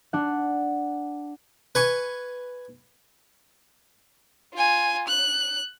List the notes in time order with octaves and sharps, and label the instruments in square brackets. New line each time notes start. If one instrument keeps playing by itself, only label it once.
[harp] D4 F#5
[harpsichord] B4 G#5 C#6
[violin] F4 G#5
F#6